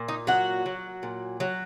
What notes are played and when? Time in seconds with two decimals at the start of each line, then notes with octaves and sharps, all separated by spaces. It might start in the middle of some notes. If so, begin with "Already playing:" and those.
Already playing: A#2
0.08 D#4
0.27 F#3 F#4
0.66 F#3
1.03 A#2
1.40 F#3